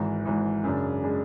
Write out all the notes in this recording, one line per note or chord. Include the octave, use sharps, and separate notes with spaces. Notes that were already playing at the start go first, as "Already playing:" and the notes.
Already playing: G#1 G#2 E3
G#1 G#2 E3
F#2 C#3 G#3 D4
C#3 G#3 D4